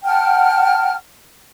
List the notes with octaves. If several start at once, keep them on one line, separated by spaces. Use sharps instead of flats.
F#5 G5 A5 F6